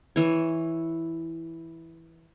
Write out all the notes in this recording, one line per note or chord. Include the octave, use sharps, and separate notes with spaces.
E3 C#5